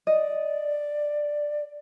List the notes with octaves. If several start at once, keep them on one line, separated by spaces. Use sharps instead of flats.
D5 D#5